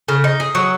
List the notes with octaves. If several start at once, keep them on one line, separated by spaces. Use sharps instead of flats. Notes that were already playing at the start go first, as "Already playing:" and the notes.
C#3
D#4
G#4
F#3